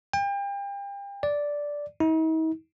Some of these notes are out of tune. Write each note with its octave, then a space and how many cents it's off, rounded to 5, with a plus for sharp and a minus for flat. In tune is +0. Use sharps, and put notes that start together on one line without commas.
G5 +35
D5 -5
D#4 +45